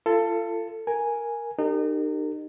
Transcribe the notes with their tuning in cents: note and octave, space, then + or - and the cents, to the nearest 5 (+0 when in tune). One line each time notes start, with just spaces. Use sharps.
F4 -30 A4 +15
A#4 +0 G#5 +0
D#4 -35 G4 +0 A#4 -40